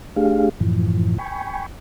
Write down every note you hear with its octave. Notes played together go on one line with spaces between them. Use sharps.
A3 D4 G4 G#4 F5
F#2 A2 E3 F3
G5 G#5 B5 C#6